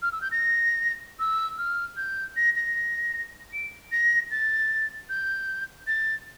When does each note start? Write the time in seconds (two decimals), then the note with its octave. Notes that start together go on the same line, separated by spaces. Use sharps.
0.02 F6
0.12 E6
0.21 G6
0.31 A#6
1.19 E6
1.58 F6
1.97 G6
2.36 A#6
2.55 A#6
3.53 D7
3.92 A#6
4.31 A6
5.09 G6
5.87 A6